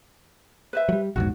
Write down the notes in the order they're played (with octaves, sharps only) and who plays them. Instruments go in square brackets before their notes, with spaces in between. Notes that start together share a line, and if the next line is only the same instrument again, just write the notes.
[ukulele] B4 C5 E5
[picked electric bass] F#3 G3
[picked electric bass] A#1 E2 G#2 [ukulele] F#4